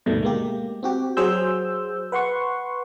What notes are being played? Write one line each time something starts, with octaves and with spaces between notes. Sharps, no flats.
D2 G#2 B2 D#3 G3 A3
G#3 A#3 G4
C4 F#4 G4
F#3 F#4 G#4 C5 E6 G6
B4 F#5 C6 C#6